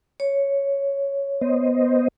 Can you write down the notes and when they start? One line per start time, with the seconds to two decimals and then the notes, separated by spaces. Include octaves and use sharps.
0.20 C#5
1.41 B3 C5 D#5